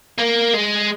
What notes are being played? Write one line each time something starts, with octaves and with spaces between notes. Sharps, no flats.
A#3
G#3